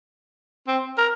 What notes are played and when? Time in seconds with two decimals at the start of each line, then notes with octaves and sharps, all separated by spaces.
0.68 C4
0.98 A#4